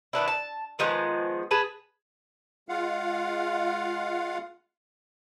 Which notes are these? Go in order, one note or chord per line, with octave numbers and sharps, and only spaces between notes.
D#3 B3 D4 E4
A5
D#3 F3 G#3 B3
G#4 B4 A5
G#3 F4 F5 F#5